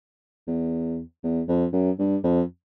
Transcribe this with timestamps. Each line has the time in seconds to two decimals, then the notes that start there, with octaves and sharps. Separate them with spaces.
0.47 E2
1.23 E2
1.48 F2
1.73 F#2
1.99 G2
2.24 F2